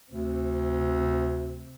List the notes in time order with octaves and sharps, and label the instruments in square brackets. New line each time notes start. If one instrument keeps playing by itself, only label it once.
[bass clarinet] D2 [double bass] C3